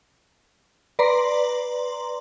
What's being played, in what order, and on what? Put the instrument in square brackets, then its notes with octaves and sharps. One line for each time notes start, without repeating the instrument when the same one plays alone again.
[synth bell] B4 D5 A#5 C6